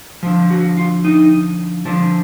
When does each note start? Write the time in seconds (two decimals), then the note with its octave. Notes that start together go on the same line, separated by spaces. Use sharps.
0.23 D3 F3
0.50 F#4
0.77 F4
1.05 D#4
1.85 D3 F3 D4